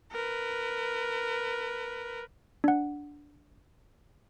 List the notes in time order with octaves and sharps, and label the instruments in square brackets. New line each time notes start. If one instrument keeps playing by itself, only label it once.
[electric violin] A#4 B4
[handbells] D4 F#5